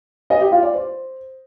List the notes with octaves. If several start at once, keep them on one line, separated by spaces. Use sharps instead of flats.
D#5
G4
F4
D5
C5